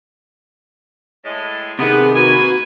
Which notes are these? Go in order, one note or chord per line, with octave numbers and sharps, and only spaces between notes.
A2 G#3
C3 D#3 B3 G#4
A#3 F#4 B4 G#5